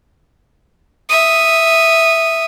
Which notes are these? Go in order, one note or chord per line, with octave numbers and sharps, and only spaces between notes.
E5 D#6